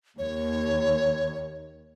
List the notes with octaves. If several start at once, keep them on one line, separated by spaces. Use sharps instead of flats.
D#2 C#5